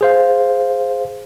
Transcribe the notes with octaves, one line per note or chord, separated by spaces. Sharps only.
G#4 C5 F5